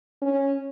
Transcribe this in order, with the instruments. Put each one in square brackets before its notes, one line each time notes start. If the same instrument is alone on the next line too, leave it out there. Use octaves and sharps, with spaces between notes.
[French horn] C#4